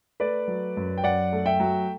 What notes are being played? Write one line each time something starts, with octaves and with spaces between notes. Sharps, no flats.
A3 B4 D5
F#3
F#2
G5
F#2 D5 F#5
A3
E5 G5
F#3